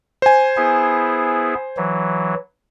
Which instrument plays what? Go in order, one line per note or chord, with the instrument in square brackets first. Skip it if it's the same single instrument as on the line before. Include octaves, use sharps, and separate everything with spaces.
[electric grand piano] C5 G#5
[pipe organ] B3 E4 G#4
E3 F#3